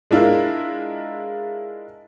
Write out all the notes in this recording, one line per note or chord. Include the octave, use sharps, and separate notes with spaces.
G#3 D4 E4 F4 A#4